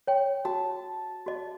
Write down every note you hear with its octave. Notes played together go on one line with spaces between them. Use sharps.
C#5 G5
F#4 A5
F#4 D#5